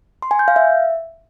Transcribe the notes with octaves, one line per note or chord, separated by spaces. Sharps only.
C6
G#5
G6
F5
E5